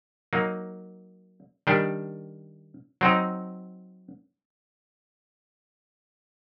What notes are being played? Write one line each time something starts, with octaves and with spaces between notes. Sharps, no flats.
F#3 A#3 D#4
D#3 G3 D4
F#3 C4 D#4